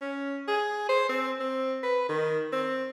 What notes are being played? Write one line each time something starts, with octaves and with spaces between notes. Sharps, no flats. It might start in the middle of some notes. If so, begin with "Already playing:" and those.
C#4
G#4
C5
C4
C4
B4
D#3
C4